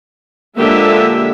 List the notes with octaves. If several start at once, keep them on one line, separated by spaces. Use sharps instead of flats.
D3 F3 G#3 A#3 G4 E5